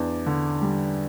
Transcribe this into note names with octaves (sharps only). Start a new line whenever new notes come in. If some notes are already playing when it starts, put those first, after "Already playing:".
Already playing: E2 D4
D3
G3